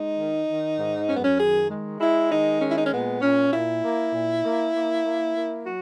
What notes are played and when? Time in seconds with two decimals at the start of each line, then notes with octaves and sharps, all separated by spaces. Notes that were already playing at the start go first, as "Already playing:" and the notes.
Already playing: G#3 D#4
0.17 D#3
0.47 D#3
0.78 G#2
1.08 F#2 C#4
1.15 B3
1.23 C#4
1.39 D#3 G#4
1.70 G#3
2.00 G#3 E4
2.31 D#3 D#4
2.61 G#3 C#4
2.69 E4
2.76 D#4
2.84 C#4
2.92 A#2 B3
3.21 A#2 C#4
3.52 A#2 E4
3.83 A#3
4.13 A#2
4.44 A#3
4.74 A#3
5.05 A#3
5.35 A#3
5.65 F#3 F#4